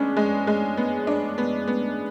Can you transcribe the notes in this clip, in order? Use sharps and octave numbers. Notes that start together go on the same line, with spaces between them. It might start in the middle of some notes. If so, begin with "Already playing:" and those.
Already playing: G#3 B3 C#4 D4
G#3
G#3
B3
D4
B3
B3